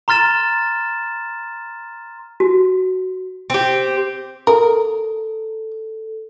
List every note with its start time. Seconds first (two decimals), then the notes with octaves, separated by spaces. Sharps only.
0.08 A#5 C6 F6 A6 E7
2.40 F#4
3.50 C4 G4
4.47 A4 A#4